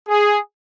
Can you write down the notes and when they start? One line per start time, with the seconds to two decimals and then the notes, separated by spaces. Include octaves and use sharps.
0.09 G#4